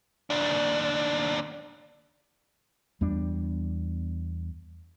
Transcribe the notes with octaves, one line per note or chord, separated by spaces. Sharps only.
D#2 D4
E2 G3 B3 D4